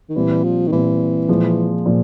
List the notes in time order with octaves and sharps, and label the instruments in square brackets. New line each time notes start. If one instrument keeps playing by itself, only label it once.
[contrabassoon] D#3
[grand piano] A#2 G3 C4 [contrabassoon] E3
[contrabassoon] F3
D#3
[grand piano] A#2 G3 C4 [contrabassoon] E3
[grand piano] A#2 F3 G#3
A#2 F3